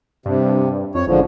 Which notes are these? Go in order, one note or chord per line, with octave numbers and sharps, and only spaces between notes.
G2 C3
F2 C#5
A1 G#2 D3 F3